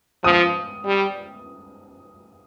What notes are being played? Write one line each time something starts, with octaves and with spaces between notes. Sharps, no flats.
F3 D#6
G3